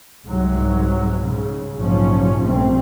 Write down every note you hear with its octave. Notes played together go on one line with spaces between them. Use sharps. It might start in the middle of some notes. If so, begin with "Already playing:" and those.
C2 G#2 F#3
G#2 C#3
A#1 G#2 C#3 F3 F#3 C#4
A#1 G2 A3 C4